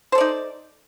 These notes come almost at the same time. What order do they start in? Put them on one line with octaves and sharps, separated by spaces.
C5 A4 D5 D#4